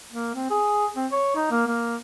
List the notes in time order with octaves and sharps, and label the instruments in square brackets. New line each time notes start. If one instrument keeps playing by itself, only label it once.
[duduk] A#3
C4
G#4
C4
C#5
D#4
A#3
A#3